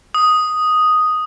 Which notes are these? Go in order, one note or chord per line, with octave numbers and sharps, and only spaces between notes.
D#6